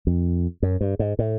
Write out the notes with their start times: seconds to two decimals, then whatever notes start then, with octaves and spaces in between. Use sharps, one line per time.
0.07 F2
0.62 F#2
0.81 G2
0.99 G#2
1.19 A2